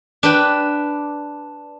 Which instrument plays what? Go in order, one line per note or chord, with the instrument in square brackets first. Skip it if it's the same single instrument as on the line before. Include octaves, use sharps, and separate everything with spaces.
[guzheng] D4 B4 G5